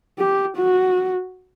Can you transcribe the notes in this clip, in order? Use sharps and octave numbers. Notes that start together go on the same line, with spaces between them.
G4
F#4